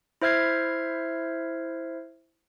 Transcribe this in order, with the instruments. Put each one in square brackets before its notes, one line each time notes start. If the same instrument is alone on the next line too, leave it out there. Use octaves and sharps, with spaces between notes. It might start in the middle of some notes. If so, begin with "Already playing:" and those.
[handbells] E4 C5 E5 F6 G#6 C7